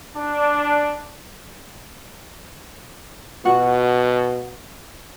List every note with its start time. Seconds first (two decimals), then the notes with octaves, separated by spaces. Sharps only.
0.16 D4
3.45 B2 F4 F#4 F#5